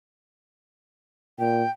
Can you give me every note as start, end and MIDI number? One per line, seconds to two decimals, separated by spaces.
1.39 1.63 46
1.39 1.71 79